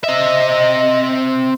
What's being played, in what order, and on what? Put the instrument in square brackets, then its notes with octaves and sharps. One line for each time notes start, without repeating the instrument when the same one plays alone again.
[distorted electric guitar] C4 E5 [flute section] D#5